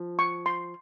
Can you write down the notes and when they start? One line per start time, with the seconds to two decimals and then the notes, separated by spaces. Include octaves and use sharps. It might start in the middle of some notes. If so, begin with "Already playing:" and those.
Already playing: F3
0.19 C#6
0.46 C6